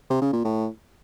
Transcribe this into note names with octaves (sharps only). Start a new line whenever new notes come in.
C3
C#3
A#2
A2